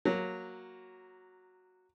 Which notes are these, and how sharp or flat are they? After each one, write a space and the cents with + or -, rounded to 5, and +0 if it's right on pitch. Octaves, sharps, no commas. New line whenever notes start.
F#3 -5 A#3 +0